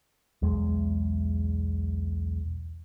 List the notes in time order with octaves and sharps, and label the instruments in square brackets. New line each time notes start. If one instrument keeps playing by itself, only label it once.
[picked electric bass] B1 E2 G#3